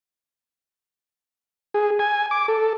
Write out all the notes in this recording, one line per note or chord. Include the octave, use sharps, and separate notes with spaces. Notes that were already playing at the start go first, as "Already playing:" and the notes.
G#4
G#5
D6
A4